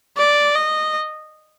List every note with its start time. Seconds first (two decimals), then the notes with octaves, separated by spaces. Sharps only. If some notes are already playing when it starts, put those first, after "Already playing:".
0.18 D5
0.56 D#5